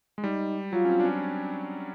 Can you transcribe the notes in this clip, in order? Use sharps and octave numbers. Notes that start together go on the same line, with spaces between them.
G#3
G3 D#4
F#3 F4
C#4
C4
D4
C#4